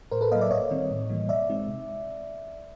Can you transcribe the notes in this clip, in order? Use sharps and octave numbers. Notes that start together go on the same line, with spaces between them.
A2 A#4 C5
A4 B4
F#3 A#3 D#5 F5
D5 E5
G#2 C#5 D#5
D#3 G3 C4
A2
E3 G3 A#3
B2 D5 E5
G#3 C4 D#4
C3